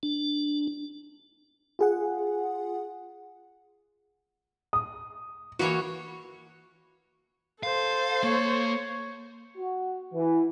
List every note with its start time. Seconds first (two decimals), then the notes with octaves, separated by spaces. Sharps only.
0.03 D4
1.79 F4 G#4 F#5
4.73 D#6
5.59 E3 A#3 F#4 C#5
7.63 A4 C5 F5
8.24 A#3 C#5
9.57 F#4
10.13 E3